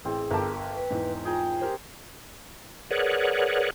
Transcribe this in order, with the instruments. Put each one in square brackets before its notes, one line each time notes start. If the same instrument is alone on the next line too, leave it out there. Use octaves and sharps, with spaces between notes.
[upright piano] A1 [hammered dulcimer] C4 [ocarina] G#4
[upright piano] G1 A5 [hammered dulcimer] G4 A#4
[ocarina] B4
[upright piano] E2 G#2
[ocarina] F4 [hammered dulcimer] G#4 G5 A#5
[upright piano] G4 A#4 C5
[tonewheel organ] G#4 A#4 B4 C#5 D5 F#5